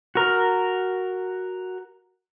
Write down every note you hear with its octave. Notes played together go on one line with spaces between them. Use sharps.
F#4 A#4